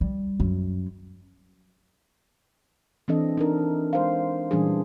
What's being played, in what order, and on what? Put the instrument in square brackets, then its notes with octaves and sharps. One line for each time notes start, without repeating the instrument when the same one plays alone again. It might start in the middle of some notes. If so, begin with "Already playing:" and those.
[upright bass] G3
F#2
[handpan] E3 C4 D4 A4 D#5
D4 D#4 A#4
G#3 C5 F5
A#2 E3 G3 C#4 D4 G#4